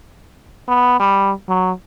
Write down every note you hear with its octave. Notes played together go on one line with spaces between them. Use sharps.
B3
G3
F#3